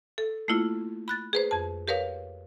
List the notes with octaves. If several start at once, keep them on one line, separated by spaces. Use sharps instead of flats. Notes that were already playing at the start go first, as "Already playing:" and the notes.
A4
A3 A#3 E4 F4
B5 F#6 A6
G#4 B4 C5
F2 A5
G4 A#4 B4 C#5 F5